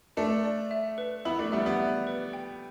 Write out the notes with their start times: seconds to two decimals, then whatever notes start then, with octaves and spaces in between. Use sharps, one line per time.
0.17 A3 D4 A5
0.45 D5
0.71 E5
0.98 B4
1.25 B3 E4 B5
1.39 A3 D4
1.52 G3 B3 E5
1.66 G3 B3
1.80 E5
2.07 B4
2.33 G5